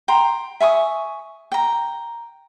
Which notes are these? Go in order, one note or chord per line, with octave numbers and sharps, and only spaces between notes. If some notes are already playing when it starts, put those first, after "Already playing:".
G5 A#5 C6
E5 G#5 C#6 D#6
G5 A#5